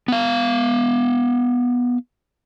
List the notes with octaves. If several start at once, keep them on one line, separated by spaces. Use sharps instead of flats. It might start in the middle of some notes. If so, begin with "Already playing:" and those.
B3 F5